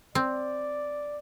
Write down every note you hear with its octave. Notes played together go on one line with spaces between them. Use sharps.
C4 D5